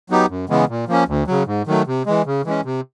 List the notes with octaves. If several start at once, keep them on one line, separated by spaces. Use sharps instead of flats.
F#3 B3 D#4 G4
F#2
C#3 E3 G#3 B3
A#2
F3 A#3 C#4
D2
C#3 F#3
G#2
D#3 F#3 A3
C3
E3 G#3
C#3
E3 G#3 C#4
C3